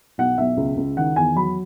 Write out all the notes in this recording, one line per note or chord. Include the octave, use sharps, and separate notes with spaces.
B1 F#5
B1 E5
C#2
C#2
D#3 F#5
E2 G#5
F#3 B5